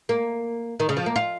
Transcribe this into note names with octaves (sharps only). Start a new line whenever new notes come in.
A#3
D#3
C#3
F3
A#3
F4